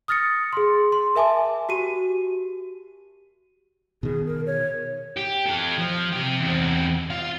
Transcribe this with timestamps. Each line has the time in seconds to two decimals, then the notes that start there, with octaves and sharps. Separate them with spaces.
0.08 D#6 F6 A6 A#6 C#7
0.53 G#4 C6
0.92 C6
1.16 A#4 E5 G#5 A5 D6
1.69 F#4 G4 D#7
4.03 B2 D#3 G#4
4.26 A#4
4.47 C#5
5.17 G4
5.46 F4 A4
5.79 F3
6.12 C3 G4
6.40 E2 C4
7.10 F4 F5